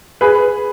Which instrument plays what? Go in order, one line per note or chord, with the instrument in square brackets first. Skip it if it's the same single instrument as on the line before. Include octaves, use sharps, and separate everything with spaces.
[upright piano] G#4 B4